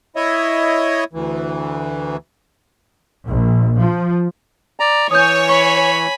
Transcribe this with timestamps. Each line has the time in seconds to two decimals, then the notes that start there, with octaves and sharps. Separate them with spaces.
0.16 E4 C#5 D#5 E5
1.13 D2 E3
3.29 A#1
3.80 F3
4.80 D5 A#5
5.11 E3 C#5 G#5 D#6 G6
5.49 G#5 B5 C#6